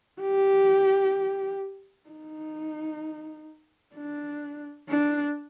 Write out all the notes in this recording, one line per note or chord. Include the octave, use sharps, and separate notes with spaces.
G4
D#4
D4
D4